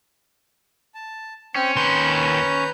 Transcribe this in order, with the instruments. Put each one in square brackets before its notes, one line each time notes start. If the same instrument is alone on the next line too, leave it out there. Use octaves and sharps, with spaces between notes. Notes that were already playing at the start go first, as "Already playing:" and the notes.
[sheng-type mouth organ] A5
[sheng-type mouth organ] C4 G5 [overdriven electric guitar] C#4
[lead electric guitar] D#2 C6 [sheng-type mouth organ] B4 A#5 G6